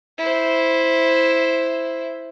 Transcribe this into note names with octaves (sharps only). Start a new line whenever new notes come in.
E4 C5